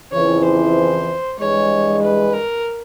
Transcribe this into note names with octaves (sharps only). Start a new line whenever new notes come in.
F2 C#3 E3 C#5
C5
G2 E3 G#3 C#5
B4
A#4